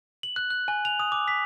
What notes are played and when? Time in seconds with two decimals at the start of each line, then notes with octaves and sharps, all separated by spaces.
0.23 F#7
0.36 F#6
0.50 F#6
0.68 G#5
0.85 F7
1.00 D#6
1.12 D6
1.28 B6